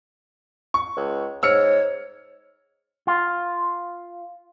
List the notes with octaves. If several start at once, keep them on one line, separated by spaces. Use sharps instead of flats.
C#6
C#2
G#2 C#5 E6 F6 C#7
F4